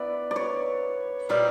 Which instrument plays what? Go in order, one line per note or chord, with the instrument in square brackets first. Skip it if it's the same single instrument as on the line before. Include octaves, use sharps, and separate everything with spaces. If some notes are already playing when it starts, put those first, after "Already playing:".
Already playing: [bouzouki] B3 E4 [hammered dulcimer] B4 D5
[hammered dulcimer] D5
C#5
[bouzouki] A#2 G3 A#3 D#4 [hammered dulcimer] D5